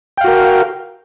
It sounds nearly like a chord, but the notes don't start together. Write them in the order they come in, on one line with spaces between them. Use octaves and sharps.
G5 F5 F#4 A#4